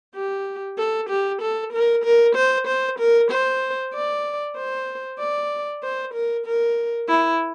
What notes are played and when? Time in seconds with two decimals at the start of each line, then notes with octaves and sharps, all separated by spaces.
0.15 G4
0.78 A4
1.10 G4
1.42 A4
1.73 A#4
2.04 A#4
2.36 C5
2.67 C5
2.99 A#4
3.31 C5
3.94 D5
4.57 C5
5.19 D5
5.83 C5
6.14 A#4
6.46 A#4
7.08 E4